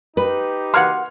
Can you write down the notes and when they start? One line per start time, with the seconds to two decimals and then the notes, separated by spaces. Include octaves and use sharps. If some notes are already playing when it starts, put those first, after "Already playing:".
0.17 D#4 G4 B4
0.74 A#3 F#4 F#5 C6 F6 G#6